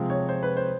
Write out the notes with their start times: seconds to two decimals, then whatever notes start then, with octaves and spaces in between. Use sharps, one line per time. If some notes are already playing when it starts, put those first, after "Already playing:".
Already playing: C3 F3 G#3
0.10 C#5
0.29 C5
0.43 B4
0.57 C5